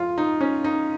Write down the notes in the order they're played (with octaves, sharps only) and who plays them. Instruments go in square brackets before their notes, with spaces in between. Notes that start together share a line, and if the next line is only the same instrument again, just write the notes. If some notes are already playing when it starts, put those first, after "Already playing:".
Already playing: [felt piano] F2 F4
D#4
C#4
D#4